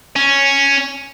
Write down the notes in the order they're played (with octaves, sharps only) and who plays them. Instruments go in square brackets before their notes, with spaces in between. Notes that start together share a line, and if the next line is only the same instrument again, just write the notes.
[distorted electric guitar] C#4